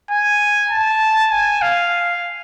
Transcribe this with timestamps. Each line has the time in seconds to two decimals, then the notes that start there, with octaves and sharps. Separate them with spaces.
0.10 G#5
0.70 A5
1.31 G#5
1.62 F5